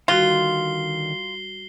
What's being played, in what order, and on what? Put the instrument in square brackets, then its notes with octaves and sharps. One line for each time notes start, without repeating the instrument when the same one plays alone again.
[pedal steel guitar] D3 D#3 [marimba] G3 F#4 [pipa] F4 [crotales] C7 G7